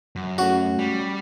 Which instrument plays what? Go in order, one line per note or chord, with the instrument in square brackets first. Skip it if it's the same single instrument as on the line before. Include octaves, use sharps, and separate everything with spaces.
[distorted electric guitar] F#2
[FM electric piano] A3 C#4 C#5 [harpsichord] F#4
[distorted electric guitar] G3